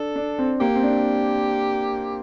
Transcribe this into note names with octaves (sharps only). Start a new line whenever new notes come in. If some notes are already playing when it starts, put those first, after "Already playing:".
Already playing: D4 A4
D4
C4
A#3 G4
C4
D4